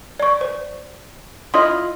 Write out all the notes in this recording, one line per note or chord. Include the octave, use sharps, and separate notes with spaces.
D5 C#6
C5
E4 F4 D#5 C6 D#6